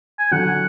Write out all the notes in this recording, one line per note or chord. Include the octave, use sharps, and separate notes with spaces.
G#5
D3 F#3 F#5